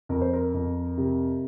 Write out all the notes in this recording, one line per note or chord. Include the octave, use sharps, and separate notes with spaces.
F2 A#4
C5
A#4
F2
C3